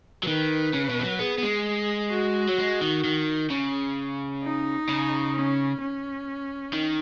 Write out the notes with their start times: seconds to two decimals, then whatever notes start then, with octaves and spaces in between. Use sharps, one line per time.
0.23 F#3
0.27 D#3 B4
0.73 C#3
0.89 B2
1.00 D#3
1.04 F#3
1.19 B3 G#4
1.38 B3
1.43 G#3
2.11 F#4
2.48 F#3
2.58 G#3
2.81 D#3
3.04 D#3
3.50 C#3
4.43 D#4
4.89 C#3
5.35 C#4
5.81 C#4
6.73 D#3